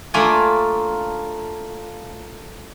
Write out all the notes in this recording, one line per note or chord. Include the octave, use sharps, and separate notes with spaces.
A3 A#3 D4 F4 D5 G#5